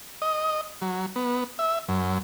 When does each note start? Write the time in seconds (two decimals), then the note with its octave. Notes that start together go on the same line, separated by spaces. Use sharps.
0.22 D#5
0.82 F#3
1.16 B3
1.59 E5
1.88 F#2